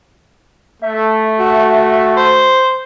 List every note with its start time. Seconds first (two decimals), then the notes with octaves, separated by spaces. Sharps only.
0.82 A3 E5
1.39 F#4
2.17 C5